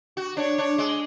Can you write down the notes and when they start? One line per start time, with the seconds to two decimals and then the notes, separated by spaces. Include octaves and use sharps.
0.17 F#4
0.37 D4 C#5
0.58 D4
0.78 G#3